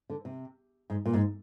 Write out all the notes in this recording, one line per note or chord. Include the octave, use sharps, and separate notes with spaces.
D3
C3
G#2
A#2
G#2